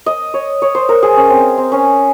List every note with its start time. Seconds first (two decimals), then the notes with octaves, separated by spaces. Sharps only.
0.06 D#5
0.34 C#5
0.62 C#5
0.75 C5
0.89 A#4
1.03 G#4
1.17 C#4
1.30 C4
1.58 C4
1.72 C#4